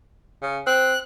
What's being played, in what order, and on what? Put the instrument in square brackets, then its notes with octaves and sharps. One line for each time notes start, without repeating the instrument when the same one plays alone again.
[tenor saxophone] C#3
[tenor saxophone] C4 [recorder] F#6